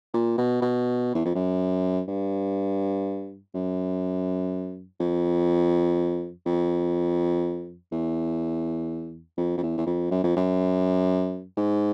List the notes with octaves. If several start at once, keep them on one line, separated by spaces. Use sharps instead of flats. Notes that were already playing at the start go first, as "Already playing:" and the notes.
A#2
B2
B2
E2
F2
F#2
G2
F#2
F2
F2
E2
F2
F2
E2
E2
F2
F#2
F2
F#2
G#2